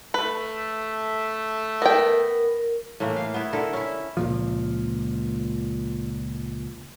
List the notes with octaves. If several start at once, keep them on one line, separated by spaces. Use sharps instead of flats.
A3 B4
B3 A#4 G5
A2 E3 A3 A#3
F5
B3 E4
D3 E4 A4 A#4
C#4 E4
C#2 A#2 F3